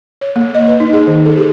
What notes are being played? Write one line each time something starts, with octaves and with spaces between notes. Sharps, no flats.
C#5
A#3
D#5
B4
D#4
G#4
D#3
A4
G4